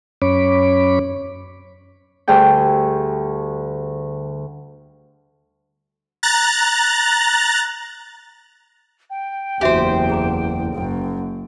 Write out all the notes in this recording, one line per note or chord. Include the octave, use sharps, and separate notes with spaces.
F#2 C#4 C#5 B5 D6
D2 D3 G3 G#4 G5
A#5 F#6 A6
G5
F#1 E2 D4 F#4 G4 C5 E5
G#4 A#5 D6
F#1 F#2